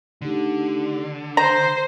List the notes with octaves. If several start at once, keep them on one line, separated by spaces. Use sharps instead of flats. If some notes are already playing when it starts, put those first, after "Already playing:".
D3 A3 D#4 G4
C5 A#5 C6